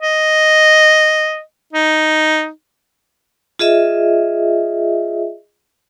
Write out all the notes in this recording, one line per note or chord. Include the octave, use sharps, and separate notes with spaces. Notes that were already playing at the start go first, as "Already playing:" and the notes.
D#5
D#4
F4 G#4 D#5 E5